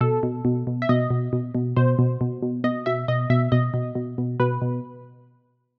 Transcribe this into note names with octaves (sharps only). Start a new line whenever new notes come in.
B2 A4
B2
B2
B2
E5
B2 D#5
B2
B2
B2
B2 C5
B2
B2
B2
B2 D#5
B2 E5
B2 D#5
B2 E5
B2 D#5
B2
B2
B2
B2 B4
B2